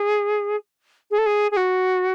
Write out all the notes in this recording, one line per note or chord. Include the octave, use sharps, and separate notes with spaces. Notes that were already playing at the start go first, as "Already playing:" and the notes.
Already playing: G#4
G#4
A4
G#4
G#4
F#4